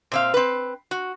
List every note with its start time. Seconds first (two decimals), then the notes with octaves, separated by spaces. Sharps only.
0.12 A#2 C4 F5
0.34 C4 B4
0.91 F#4